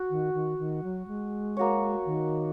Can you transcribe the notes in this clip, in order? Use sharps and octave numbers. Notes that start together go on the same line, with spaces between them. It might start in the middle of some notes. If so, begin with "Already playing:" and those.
Already playing: F#4
D#3
D#3
D#3
F#3
G#3
A#3 F#4 C#5
D#3